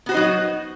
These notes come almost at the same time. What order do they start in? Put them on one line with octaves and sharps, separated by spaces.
B3 F#4 C5 D#4 F#3